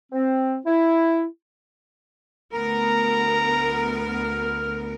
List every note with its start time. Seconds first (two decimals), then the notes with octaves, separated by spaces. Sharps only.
0.12 C4
0.66 E4
2.54 D2 B3 A#4 A#5
4.09 F6